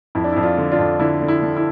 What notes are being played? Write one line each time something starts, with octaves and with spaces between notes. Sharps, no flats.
F2 E4
D4
F2 E4
D4 F4
D3
D4 F4
F2
D3 E4
D3
E4
D3
E4